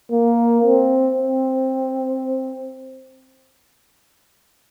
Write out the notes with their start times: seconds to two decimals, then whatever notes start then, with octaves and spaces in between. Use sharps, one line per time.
0.11 A#3
0.64 C4
1.17 C4